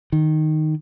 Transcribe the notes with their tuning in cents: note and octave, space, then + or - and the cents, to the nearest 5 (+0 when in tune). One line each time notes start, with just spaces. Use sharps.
D#3 -5